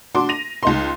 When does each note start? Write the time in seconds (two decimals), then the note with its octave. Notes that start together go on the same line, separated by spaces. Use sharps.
0.15 D4 F#4 C6 D6
0.29 A#6 D#7 F7
0.63 C#2 D#4 C6